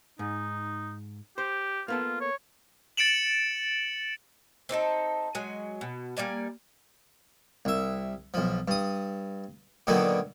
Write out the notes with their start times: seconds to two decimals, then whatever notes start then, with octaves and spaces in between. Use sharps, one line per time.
0.19 G#2 D#4
1.38 G4 C5
1.88 A#3 B3 F4 A4
2.21 C#5
2.97 A6 C#7 D7 E7 F#7
4.69 C4 D4 D#4 A4
5.35 F#3 G#3 G#5
5.81 B2
6.17 G3 A#3 D5 G#5
7.65 C2 E5
8.34 B1 F3
8.68 G2 D#6
9.87 A#2 D3 D#3 F#3 A#3 B3